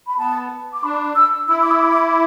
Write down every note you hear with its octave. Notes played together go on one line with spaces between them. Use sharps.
B5
B3 A5
D6
D4 B5
E6
E4 E6
D6
E6
D6